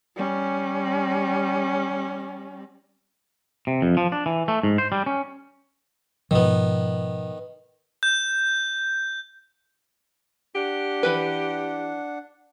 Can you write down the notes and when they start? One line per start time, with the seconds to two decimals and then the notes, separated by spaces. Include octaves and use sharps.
0.17 G3 C#4
3.67 C3
3.82 F2
3.97 F3
4.12 D4
4.26 E3
4.48 A3
4.63 G#2
4.78 C5
4.92 G3
5.06 C#4
6.31 G#2 B2 D#3 F3 B3
8.03 G6
10.55 D4 G4 F#5
11.03 E3 B4